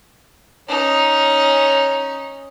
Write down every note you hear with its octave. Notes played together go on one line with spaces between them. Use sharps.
C#4 D#4